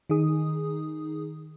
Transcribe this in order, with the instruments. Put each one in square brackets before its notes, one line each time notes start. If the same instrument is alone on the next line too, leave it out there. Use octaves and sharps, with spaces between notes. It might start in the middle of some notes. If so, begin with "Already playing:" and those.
[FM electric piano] D#3 D#4 G#4 D#6